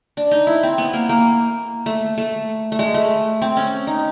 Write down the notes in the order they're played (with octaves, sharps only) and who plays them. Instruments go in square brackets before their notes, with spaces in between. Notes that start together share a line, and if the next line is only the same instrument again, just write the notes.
[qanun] D4
D#4
E4
C4
B3
A#3
A#3
A3
A3
A3
G#3
A3
C4
C#4
D#4